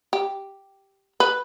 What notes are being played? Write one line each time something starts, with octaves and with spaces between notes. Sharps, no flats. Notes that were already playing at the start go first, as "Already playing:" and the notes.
G4
B4